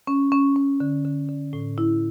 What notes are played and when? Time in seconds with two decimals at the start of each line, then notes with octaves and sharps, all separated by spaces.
0.07 C#4
0.32 C#4
0.56 C#4
0.80 D3
1.05 D3
1.29 D3
1.53 A2
1.78 E4